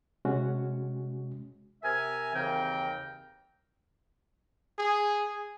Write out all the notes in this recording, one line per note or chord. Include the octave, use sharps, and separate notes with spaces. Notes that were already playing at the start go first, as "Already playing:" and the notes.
C3 G#3 C#4 F#4
C3 A#4 E5 G#5
D#2 C#3 E3 C4 A#4 G5
G#4